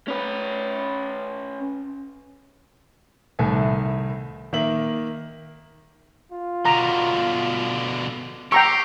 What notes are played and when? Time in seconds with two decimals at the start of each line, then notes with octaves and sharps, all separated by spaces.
0.08 C#4 B4
3.39 C2 A2 D#3 A4 E5 G#5
4.53 D#3 A#3 E5 F#7
6.32 F4
6.65 B2 D3 A#5
8.52 G4 G5 A#5 C#6 E6 C7